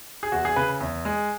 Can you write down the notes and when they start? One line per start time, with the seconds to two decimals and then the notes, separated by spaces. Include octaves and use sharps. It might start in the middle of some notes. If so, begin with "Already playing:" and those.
0.23 G#4
0.32 E2 F#4
0.45 G#4
0.56 C#3 B4
0.81 E2
1.05 G#3